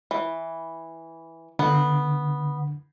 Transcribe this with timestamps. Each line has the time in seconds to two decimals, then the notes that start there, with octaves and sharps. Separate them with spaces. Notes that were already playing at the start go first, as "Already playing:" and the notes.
0.11 E3
1.59 D3 B3